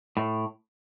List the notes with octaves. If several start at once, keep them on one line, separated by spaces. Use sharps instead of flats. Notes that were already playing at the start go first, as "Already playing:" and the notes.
A2